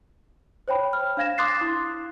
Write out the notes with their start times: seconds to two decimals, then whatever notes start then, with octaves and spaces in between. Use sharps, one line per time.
0.68 C5 C#5 G5 B5
0.93 F6
1.17 D4 F5 G#6 A#6 E7
1.38 C6 D6 D#6 F#6 A6 C7
1.61 E4